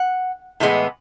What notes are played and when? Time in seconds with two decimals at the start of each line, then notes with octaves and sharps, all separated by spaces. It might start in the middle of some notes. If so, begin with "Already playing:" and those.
Already playing: F#5
0.60 A2 E3 G#3 B3